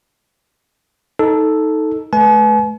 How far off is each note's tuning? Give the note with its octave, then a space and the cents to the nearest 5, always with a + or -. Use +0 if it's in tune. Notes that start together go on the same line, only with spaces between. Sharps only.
D#4 +15 A4 +0
A3 -35 B4 +0 G#5 +45